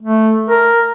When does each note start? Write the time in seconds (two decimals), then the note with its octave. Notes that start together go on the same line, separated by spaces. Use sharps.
0.02 A3
0.50 A#4